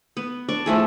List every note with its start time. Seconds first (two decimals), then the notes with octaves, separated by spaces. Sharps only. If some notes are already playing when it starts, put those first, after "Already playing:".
0.17 B3
0.49 D4 D5 C#6
0.66 E3 F3 A3 G#4